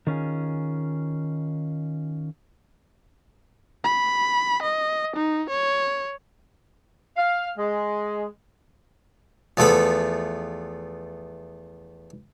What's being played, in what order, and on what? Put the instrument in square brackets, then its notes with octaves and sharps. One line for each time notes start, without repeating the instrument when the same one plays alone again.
[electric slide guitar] D#3 C#4 F4 G#4
[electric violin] B5
D#5
D#4
C#5
[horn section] F5
G#3
[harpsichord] E2 F3 A3 B3 A4 B5